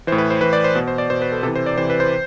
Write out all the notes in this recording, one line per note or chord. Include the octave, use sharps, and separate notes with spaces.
A2 E3 C5
B4
C5
A2 E3 B4
D5
C5
B2
C5
D5
B2 C5
B4
A4
C3 E3 A4
C5
D5
C3 E3 C5
B4
C5